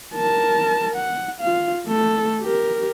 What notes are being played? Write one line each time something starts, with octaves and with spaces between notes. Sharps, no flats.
A#4 A5
F#5
F4 F5
A3 A4
G4 A#4